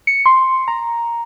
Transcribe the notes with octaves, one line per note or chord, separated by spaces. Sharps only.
C#7
C6
A#5